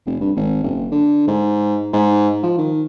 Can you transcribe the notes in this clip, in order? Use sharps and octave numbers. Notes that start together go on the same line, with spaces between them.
F1
G2
G#1
F#1
D3
G#2
G#2
F3
D#3